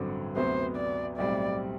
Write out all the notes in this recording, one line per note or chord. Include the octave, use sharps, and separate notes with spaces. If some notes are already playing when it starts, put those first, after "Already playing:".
Already playing: A1 G2 D3 F#3 C4
D2 C3 F#3 B3 C5
D5
B1 A2 G3 C4 D5